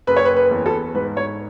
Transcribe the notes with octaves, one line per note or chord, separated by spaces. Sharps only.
F#1 B4
C#5
B4
B4
E2
A4
G#2 B4
C#5